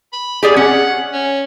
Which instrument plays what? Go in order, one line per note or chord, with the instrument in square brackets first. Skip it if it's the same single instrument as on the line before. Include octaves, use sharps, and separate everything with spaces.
[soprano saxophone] B5
[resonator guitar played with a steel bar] G4 G#4 D5 [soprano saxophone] G#5
[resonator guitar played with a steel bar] C#4 [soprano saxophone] F#5
[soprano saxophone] C#4